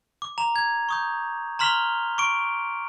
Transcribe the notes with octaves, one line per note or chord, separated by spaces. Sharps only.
D6
A#5 F7
G#6
C#6 D#6 G6
A#5 C6 F6 B6 F7 G7
C#6 D6 D7